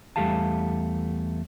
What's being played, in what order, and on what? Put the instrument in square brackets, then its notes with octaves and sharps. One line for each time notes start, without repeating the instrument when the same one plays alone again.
[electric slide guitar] E2 G3 A3 G4 F5 A5